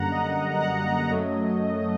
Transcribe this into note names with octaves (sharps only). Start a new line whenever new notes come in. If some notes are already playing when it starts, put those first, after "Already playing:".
Already playing: F#2 D3 G3 A#3 F#5 A#5
D#5
D#5
F#5
D#5
F#2 F#3 A3